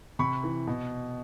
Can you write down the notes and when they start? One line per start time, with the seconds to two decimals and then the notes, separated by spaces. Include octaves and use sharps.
0.19 C3 B5 C#6
0.44 E3
0.67 B2